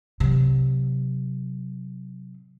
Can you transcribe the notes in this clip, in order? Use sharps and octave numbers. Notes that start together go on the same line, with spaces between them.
C3 F#3